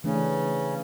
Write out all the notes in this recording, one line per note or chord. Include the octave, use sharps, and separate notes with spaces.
C#3 E3 A3 D4